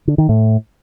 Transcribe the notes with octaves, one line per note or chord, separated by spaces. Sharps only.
D3
D#3
A2